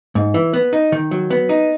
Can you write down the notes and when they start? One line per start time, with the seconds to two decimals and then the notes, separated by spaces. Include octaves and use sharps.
0.15 G#2
0.34 E3
0.53 B3
0.73 D#4
0.92 D#3
1.11 F#3
1.30 B3
1.49 D#4